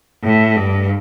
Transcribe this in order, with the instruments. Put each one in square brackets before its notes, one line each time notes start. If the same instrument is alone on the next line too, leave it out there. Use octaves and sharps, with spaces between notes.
[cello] A2
G2